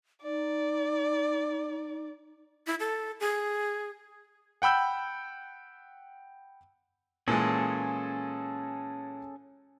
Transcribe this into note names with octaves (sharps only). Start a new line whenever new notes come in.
D#4 D5
E4
A4
G#4
F#5 G5 B5 E6 G6
A#2 E3 G#3 C#4 G#4 A4